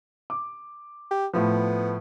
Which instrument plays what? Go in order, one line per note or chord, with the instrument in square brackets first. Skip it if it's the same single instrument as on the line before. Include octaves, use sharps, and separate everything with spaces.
[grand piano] D6
[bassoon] G4
[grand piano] A2 F3 [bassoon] B3